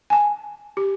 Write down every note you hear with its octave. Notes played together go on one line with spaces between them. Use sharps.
G#5 A5
G4